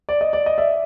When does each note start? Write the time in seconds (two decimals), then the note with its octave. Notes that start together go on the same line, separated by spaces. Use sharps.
0.09 D5
0.21 D#5
0.33 D5
0.46 D#5
0.58 D5 E5